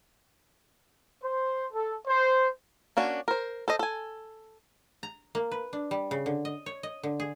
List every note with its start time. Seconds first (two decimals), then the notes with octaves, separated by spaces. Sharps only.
1.22 C5
1.73 A4
2.07 C5
2.97 A#3 C#4 D4 F#4
3.28 A#4 C5
3.68 A4 C5 D#5
3.79 A4 G#5
5.03 A#5
5.35 A#3
5.51 B4
5.73 D4
5.91 G3
6.11 C#3
6.26 D3
6.45 D#5
6.66 C#5
6.83 D#5
7.03 D3
7.20 G#4